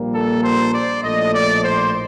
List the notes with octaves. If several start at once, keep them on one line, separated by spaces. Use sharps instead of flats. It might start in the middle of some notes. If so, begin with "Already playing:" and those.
Already playing: A#1 A#2 G3 A#3
A4
C5
D5
A#1 A2 A3 D#5
D5
C5